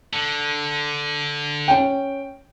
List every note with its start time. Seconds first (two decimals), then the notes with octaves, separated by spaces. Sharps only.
0.13 D3
1.68 C#4 G5